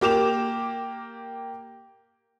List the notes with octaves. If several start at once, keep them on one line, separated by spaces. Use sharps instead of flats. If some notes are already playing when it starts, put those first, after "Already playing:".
A#3 G4 D6 E7 F7